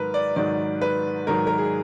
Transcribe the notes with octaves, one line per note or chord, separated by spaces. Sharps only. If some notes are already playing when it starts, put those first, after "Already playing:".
Already playing: G#2 D#3 F#3 A#4 B4
D5
G#2 D#3 F#3 D5
B4
G#2 D#3 F#3 A#4
A#4
G#4